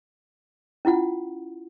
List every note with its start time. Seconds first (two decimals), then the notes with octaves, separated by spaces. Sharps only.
0.85 C#4 E4 F4 F#5